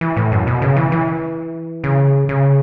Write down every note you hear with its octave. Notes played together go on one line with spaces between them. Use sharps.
E3
A2
F#2
B2
C#3
E3
E3
C#3
C#3